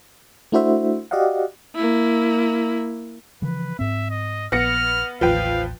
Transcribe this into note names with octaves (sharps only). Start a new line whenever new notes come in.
A3 D4 E4 F#4 C5 E5
F#4 G4 D5 D#5 F5 F#5
A#3 E4
C#3 E3 F3 B4
G#2 C4 E5
D#5
A#1 B3 F6 A#6 C#7
A1 D#2 F3 B4 F5 G5